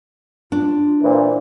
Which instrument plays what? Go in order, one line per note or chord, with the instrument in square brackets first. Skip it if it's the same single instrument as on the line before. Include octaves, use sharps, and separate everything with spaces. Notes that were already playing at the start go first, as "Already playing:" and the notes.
[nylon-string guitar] D4 [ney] F4
[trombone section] A#2 E3 [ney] C5